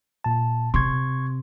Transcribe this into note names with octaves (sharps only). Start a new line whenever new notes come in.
A#2 A5
C3 C6 C#6 G#6